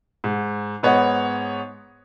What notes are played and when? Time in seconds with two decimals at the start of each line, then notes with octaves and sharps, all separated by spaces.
0.24 G#2
0.83 G#2 B3 C#5 D#5 F#5